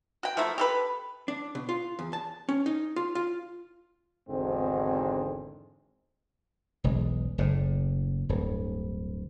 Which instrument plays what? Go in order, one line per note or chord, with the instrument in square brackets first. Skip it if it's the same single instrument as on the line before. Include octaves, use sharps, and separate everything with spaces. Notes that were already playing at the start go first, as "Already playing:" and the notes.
[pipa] F#4 G5
F3 A3 A#3 E4
G4 A4 B4
[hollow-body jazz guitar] D4
B2
F4
E2
A5
C#4
D#4
F4
F4
[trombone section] G#1 E2 G#2 D3 C4
[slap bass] E1 B1 G#3
F#1 A2
D1 G2